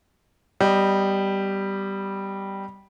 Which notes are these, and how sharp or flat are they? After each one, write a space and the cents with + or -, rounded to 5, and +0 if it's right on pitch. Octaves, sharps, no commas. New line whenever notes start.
G3 -5 B3 +10 D#5 -15